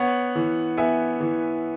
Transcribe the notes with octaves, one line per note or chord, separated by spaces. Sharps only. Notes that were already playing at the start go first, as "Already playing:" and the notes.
Already playing: B3 C#5 F#5
E3
B3 E5 G#5
E3